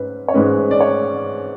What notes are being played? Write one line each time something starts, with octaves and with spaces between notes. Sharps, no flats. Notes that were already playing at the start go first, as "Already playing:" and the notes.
Already playing: G#2 C#4 B4
C#5
G#2 G#3 C#4 B4
D5
C#5